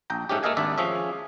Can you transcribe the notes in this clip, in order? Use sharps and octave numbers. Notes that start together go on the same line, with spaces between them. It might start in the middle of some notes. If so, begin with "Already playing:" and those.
A#1 G5 A#5
G#2 A3 C#4 G4
A3 A#3 A4 D#5 F5 G#5
G#1 D#2 D4 D5 E5
F3 C#4 G#4 C#5 E5